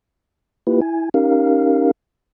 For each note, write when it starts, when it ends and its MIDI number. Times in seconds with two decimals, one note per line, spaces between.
0.67 0.80 58
0.67 0.80 64
0.67 0.80 65
0.67 0.80 67
0.67 0.80 71
0.81 1.09 64
0.81 1.09 80
1.14 1.91 61
1.14 1.91 63
1.14 1.91 67
1.14 1.91 70
1.14 1.91 77